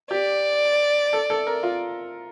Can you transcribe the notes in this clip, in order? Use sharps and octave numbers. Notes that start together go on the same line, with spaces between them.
G4 D5
A4
A4
A#4
F4